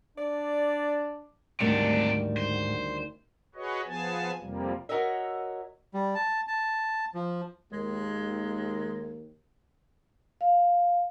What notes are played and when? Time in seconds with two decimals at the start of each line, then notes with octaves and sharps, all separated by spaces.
0.18 D4 D5
1.60 D2 G#2 C3 D#3 G3 D4
2.37 C5
3.55 F#4 G#4 B4 C#5 D#5
3.87 F3 B3 G#4 G#5 A5
4.41 F2 C3 F3 G3 A#3
4.89 F#4 A#4 C#5 D#5 E5
5.94 G3
6.15 A5
6.48 A5
7.14 F3
7.72 D#2 G#3
10.41 F5